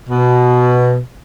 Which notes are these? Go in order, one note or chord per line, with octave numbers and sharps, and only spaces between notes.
B2